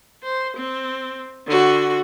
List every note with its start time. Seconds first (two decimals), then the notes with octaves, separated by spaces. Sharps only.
0.24 C5
0.56 C4
1.47 D3 F#4